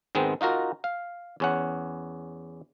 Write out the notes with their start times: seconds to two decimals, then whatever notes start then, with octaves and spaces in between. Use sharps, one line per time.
0.15 G#2 D#3 G#3 B3 C4
0.41 D#4 F4 F#4 A#4
0.84 F5
1.40 E2 C#4 F#5